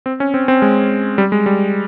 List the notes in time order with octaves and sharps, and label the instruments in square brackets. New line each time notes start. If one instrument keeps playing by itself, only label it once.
[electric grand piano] C4
C#4
C4
C4
G#3
G3
G#3
G3